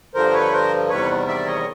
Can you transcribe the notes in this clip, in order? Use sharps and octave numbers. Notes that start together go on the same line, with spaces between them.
G2 D3 F3 A#4 C5
B4 C#5
A#4 C5
E2 C3 D#3 G3 B4 C#5
D5 E5
C#5 D#5